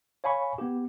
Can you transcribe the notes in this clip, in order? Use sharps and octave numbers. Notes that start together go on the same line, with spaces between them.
C#5 F5 G#5 B5 C#6
B3 G4